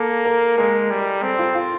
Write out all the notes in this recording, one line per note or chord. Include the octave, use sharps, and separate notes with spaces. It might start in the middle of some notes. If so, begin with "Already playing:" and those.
Already playing: A#3 A4
A#4
G#3 A#4
G3
C4 A4
F4
F4